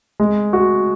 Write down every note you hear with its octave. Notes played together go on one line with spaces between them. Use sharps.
G#3
F#4